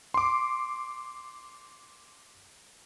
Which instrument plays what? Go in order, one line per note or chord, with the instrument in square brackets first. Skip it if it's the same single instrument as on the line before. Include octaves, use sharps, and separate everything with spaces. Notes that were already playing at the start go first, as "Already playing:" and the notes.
[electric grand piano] C6 D6